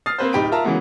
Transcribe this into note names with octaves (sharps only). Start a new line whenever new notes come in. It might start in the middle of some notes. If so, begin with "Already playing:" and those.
D#6 F6 A6 C7
A#3 C4 B4 C5
D1 D#4 G4 B5 D7
F4 A#4 E5 A5 A#5
C#3 E3 F#3 G#3 A#3 B3